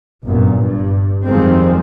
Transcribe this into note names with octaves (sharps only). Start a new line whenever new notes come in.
G1 F#2 A#2
G2
F2 D#3 F3 G3 G#3 C4